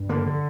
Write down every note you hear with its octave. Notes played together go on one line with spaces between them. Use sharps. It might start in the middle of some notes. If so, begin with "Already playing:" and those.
Already playing: G2
D3 A#3
D3